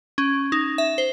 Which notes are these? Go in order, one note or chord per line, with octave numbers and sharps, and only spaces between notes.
C#4
D#4
E5
C5